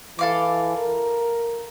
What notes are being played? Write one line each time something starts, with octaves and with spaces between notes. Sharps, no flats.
E3 A4 F5 D6
A#4